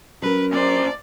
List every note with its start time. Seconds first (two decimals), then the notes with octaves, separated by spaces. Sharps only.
0.22 F#3 C#4 A#4 B4
0.52 A#2 C5 D5